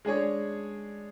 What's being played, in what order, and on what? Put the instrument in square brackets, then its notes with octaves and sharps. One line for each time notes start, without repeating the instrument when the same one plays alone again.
[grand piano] G#3 D4 G#4 C#5